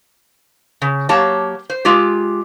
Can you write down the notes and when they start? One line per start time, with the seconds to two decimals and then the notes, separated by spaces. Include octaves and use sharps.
0.82 C#3
1.09 F#3 A#3 G4 C#5 A5
1.70 C5
1.85 G#3 F4 G4